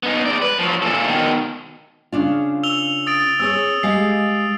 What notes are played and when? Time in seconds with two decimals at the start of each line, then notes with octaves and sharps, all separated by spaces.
0.03 B3 D#4
0.26 G#3 D5
0.42 B4
0.59 F3 F#3
0.82 A#2 A4
1.07 B2 D#3
2.12 C#3 D4 F4
2.63 E6 F7 G7
3.06 D#6 A6 D7
3.40 C4 G#4 C#5 E6
3.83 G#3 G4 F5 C7